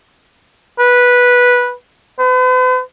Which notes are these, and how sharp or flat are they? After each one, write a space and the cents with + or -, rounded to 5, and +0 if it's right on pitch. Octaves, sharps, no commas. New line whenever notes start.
B4 -10
B4 +45